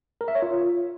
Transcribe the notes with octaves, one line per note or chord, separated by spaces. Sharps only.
A#4
E5
C#5
F4